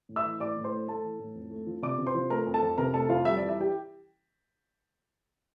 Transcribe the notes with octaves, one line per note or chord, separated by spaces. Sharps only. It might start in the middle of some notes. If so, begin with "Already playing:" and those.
A2
E5 E6
E3
A2 D5 D6
A2
C5 C6
A3
A3 A4 A5
E3
A2
F2
A3
F3
C3 D5 D6
C3
C5 C6
F3
A3 A#4 A#5
F2
A4 A5
F2
C3 A#4 A#5
A3 A4 A5
F2 F4 F5
G3 E5
E3 D5
E5
G4 G5